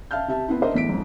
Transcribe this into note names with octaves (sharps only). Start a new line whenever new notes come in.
E5 F5 A5 F6 G6
C3 E5 A5
B3 C4 E4
D4 A#4 C5 D#5 E5
E2 A2 B6 D7
F2 G#2